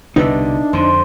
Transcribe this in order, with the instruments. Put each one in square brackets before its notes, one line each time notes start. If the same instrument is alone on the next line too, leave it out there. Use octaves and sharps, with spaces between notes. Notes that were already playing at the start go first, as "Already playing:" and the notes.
[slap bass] C2 B2 D3 [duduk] D4 [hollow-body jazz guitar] D#4 B4 E5
[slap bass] F2 D3 [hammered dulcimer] C5